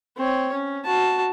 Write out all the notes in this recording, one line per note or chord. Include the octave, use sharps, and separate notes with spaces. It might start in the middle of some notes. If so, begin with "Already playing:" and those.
C4 C#5
C#4
F#4 A5